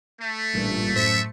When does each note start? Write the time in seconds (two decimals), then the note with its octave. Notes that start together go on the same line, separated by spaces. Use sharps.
0.22 A3
0.54 A1 G2 A#2
0.96 F#2 A2 C5 E5 C#7